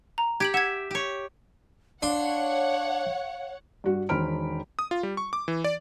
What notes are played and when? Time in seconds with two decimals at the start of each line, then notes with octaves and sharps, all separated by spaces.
0.18 A#5
0.40 G4 G#6 D7 F#7
0.54 E5 F#5 G#6
0.91 G4 C#5
2.03 D4 C#5 F5 F#5 C6
3.84 G2 F#4
4.09 E1 D#3 C5 B5 F6 D7
4.79 D#6
4.91 F4
5.03 G3
5.17 C#6
5.33 D6
5.48 E3
5.64 D5